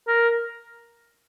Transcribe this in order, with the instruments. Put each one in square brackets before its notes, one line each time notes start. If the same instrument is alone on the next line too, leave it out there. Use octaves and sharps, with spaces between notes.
[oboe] A#4